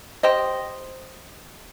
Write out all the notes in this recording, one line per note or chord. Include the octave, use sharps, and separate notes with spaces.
G4 C5 D#5